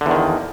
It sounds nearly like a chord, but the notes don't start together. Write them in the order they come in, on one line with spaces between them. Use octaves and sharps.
D3 E2 D#3 F3